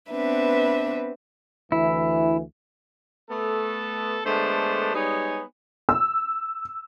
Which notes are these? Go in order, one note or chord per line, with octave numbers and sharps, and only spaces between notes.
B3 C4 D4 B4 E5
D2 E3 E4
A3 B3 A4
D3 G#3 A3 B3 D4 C5
G3 G#3 B3 D#4 C#5 G#5
E6